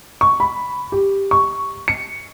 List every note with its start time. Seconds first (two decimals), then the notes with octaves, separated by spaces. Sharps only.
0.21 C#6
0.40 B5
0.92 G4
1.31 C#6
1.88 C#7